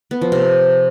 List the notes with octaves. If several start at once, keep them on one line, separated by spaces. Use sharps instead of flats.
B3
F3
C3